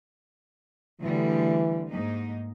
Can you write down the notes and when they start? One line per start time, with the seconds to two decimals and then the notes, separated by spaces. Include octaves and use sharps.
1.01 D2 D3 E3 G3
1.88 G#2 A#3 D#4